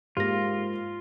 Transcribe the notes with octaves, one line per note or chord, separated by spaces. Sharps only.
G#2 A#3 F4 G4 A#6